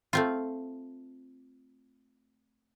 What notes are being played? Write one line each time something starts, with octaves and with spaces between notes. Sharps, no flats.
A3 C4 F4